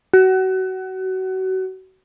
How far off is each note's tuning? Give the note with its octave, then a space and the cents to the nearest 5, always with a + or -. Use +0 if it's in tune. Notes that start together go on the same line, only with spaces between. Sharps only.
F#4 +25